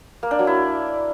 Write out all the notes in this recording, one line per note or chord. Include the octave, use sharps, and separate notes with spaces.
A#3
D4
F#3
E4